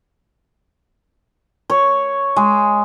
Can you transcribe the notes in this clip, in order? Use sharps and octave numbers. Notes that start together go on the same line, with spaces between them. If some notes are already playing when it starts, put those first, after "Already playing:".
C#5
G#3